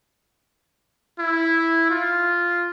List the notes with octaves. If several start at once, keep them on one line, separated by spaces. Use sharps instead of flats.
E4
F4